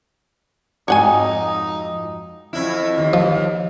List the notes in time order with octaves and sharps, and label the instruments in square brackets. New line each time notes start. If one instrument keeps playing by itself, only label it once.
[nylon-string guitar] F2 G#2 F#4 [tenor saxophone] D#4 [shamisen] C#5 F#5 G#5
[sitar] F2 E4
D#2
[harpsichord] F3